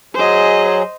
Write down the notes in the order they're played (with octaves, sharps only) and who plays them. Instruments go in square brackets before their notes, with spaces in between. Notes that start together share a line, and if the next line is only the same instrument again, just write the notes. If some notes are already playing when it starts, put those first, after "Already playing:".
[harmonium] F#3 G#4 [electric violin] C5 D#5